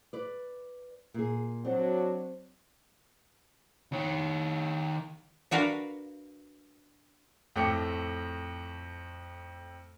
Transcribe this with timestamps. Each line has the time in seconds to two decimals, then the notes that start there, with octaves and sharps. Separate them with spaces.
0.13 B4 D5
1.14 A#2 G#4
1.64 F#3 C4 D4 F#4
3.92 D#3 C#5
5.51 D4 F#4 A#4 B4 F5
7.56 F2 A2 A3 G5 D6 C#7